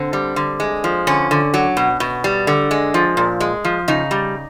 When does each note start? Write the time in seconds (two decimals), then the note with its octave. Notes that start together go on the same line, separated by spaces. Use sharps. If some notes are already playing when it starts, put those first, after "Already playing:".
Already playing: D3 C4
0.13 G3
0.36 D3
0.60 G#3
0.84 F3
1.07 D3 C#4
1.31 D3
1.54 F#3
1.77 B2
2.00 B2
2.24 G3
2.47 D3
2.71 G#3
2.94 F3
3.17 A#2
3.40 G#3
3.65 F3
3.88 C#3 D#4
4.11 G3